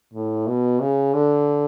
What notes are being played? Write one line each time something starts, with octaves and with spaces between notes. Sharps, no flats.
A2
B2
C#3
D3